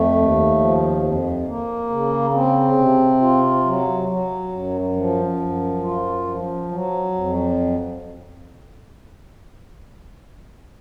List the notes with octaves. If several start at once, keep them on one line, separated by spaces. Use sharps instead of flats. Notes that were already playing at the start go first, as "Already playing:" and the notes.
Already playing: F2 A3
D#2
F3
F2
A#3
C#3
C4
C3
F4
F#3
F#3
F#2
F3
F#2
F4
F3
F#3
F2